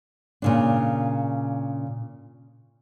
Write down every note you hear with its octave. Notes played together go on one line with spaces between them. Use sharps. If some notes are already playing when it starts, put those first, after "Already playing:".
A#2 C#3 D4